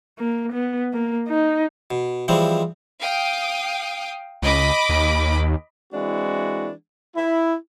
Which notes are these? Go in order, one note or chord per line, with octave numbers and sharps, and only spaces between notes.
A#3
B3
A#3
D#4
B2
E3 F3 G3 G#3 C4
F5 G5 D#6
C#2 D#5 B5 D6
D#2
E3 G#3 C4 D4 E4 F#4
E4